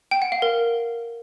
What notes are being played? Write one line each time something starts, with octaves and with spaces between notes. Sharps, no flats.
G5
F#5
F5
A#4